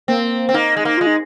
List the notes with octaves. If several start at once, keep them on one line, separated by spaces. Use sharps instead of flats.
A#3 C4
C4
A#3 D#4
G#3
A#3
G#3 F4
D#4